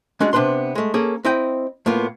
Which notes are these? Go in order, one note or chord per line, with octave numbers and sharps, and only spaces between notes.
G#3 C#4 D4 F#4 G#4
C3 B3 D4 B4 C6
G#3 A3
A#3 C#4 G#4 A4
C4 E4 D#5 G5
A2 A#3 B3 F4